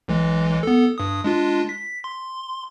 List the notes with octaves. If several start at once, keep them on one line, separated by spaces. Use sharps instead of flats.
B1 E3 G#3
B3 A4
G2 D#6
G#3 D4 F4
B6
C6